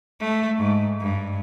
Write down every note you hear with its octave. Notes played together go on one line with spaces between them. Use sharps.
A3
G#2
G2